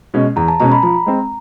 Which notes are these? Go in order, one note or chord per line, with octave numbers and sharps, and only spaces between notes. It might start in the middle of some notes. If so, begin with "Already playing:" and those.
B2 G#3 C#4
E2 A#5
A5
B2 G#3 C#4 A#5
B5
F3 A#5
G#3 C4